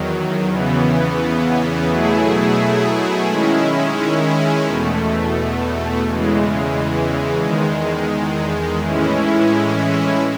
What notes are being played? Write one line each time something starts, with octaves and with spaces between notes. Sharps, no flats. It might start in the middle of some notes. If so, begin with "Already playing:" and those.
Already playing: E2 D#3 F#3
E2 C#3 E3 B3
B2 F#3 A3 E4 G#4
D#3 G#3 C#4 E4
E2 B2 A3
E2 C#3 E3 G#3
E2 D#3 G#3
A2 E3 G#3 C#4 E4